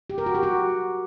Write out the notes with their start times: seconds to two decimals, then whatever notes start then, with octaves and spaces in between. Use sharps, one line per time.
0.10 G4
0.18 A#4
0.26 F#4
0.35 G4
0.43 F#4